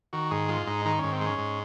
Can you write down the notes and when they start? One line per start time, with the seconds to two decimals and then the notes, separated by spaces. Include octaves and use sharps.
0.13 D#3 F#4
0.31 G#2 G#4
0.48 G#3 F4
0.66 G#2 D#4
0.85 D#3 D#4
0.99 G#2 C#4
1.12 C4
1.21 G#3
1.26 C#4
1.39 G#2